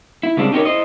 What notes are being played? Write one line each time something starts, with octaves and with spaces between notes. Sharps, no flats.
E4
C#3 G3 G#3 C4 D4
C#4 D#4 G4 A4 A#4 C#5
E4 C5 D#5